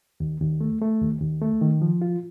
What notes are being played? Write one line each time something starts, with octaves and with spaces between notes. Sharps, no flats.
D#2
D#2
A3
A3
D#2
D#2
A3
D#3
F3
F4